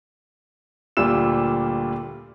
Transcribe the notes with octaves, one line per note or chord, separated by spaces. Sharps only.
D2 A#2 G3 F4 E6 E7